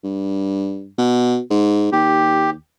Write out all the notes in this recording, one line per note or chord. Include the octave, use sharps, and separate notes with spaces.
G2
B2
G#2
D#2 G4